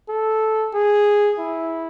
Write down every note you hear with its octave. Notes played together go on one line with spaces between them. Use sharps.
A4
G#4
E4